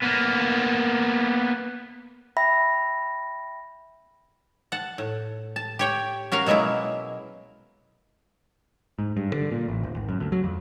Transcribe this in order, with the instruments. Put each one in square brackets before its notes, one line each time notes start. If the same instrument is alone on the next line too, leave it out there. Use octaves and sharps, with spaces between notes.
[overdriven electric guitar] A#3 B3
[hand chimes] E5 G5 B5 A#6
[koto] F#5 A5
A2
A5
G4 C#5 G5
C#4 F#4 A#4 F5
B2 F#3 G#3 A#3 E4
[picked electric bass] G#2
G2
D3
A#2
A1
D#1
G#1
F#2
D2
F#3
F2